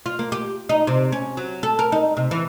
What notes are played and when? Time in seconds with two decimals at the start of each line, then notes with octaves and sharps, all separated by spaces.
0.06 F4
0.19 A#3
0.32 G4
0.69 D#4
0.87 C3
1.12 C#4
1.37 F#3
1.63 A4
1.79 A#4
1.92 D#4
2.17 C3
2.31 E3